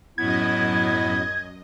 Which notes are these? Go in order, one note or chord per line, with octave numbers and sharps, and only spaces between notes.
F#2 A2 B3 E4 D#5 G#6